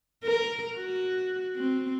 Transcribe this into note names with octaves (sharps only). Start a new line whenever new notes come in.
A#4
F#4
C4